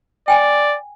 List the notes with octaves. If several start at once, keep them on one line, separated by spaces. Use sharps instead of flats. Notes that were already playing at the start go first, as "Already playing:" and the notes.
D5 G5 G#5